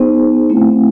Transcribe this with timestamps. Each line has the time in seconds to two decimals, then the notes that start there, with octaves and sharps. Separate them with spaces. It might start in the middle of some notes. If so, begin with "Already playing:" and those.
Already playing: B3 D#4 G#4 C5
0.50 A3 C4 E4